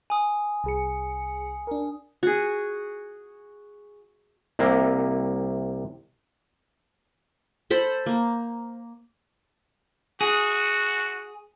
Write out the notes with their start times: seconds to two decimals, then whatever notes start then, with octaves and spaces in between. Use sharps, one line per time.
0.10 G#5 D#6
0.64 C2 G#4 C#7
1.67 D4 A#4
2.23 F#4 G#4
4.59 C2 C3 A#3
7.70 A4 C5 B5
8.06 A#3
10.21 F#4 G#4